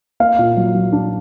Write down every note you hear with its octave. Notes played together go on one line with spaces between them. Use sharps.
A#3 F5
A#2
F#3
F#3
D4